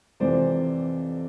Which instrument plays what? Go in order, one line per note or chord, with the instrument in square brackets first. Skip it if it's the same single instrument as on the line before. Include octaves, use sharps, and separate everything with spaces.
[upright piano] F2 C3 E3 C5 D5